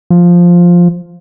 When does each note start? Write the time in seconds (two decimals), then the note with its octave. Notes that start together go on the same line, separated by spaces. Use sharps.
0.10 F3